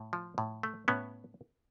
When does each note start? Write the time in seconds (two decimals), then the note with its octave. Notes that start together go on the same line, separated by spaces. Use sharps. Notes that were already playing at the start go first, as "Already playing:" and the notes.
Already playing: A2
0.13 F3
0.38 A2
0.63 A3
0.88 A2 B3 C#4